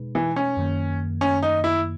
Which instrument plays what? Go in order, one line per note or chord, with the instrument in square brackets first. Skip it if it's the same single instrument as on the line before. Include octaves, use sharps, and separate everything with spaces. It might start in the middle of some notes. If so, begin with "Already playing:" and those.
Already playing: [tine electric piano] B2 G#3 D#4 G#4 B4
[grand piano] E3
C#4
[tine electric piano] F#2 D#3 A#3
[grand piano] C#4
D#4
E4